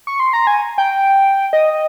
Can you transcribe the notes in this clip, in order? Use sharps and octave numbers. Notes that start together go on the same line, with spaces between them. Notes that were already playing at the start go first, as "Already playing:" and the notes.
C#6
C6
A#5
G#5
G5
D#5